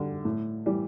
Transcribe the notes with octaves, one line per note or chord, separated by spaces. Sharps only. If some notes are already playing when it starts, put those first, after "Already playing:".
Already playing: D3 G3
A2
E3 G3